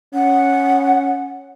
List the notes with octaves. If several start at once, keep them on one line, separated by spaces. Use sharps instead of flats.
C#4 F#5